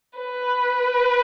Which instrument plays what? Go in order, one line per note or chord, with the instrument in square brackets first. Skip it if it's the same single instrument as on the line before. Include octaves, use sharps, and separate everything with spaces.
[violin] B4